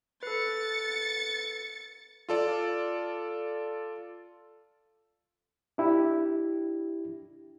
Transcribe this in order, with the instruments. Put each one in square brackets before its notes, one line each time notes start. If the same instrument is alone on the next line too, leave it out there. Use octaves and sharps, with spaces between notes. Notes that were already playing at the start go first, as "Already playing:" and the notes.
[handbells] A4 B4 [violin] A6 C#7
[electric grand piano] F4 A4 D5
[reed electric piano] D4 E4 G4